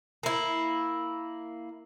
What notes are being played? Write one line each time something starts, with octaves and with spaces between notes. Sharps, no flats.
A#3 E4